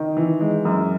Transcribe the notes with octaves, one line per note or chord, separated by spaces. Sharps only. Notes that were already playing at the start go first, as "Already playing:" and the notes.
Already playing: D#3
E3
G#3
F#2